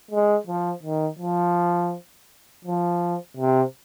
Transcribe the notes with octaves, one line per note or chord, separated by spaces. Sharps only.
G#3
F3
D#3
F3
F3
C3